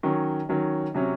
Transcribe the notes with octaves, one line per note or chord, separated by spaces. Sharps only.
D#3 F#3 C#4
D#3 F#3 C#4
C3 F#3 C#4